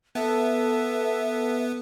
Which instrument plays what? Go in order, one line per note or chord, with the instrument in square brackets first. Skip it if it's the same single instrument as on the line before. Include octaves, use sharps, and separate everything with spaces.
[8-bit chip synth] B3 [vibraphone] A4 A5 [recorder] E5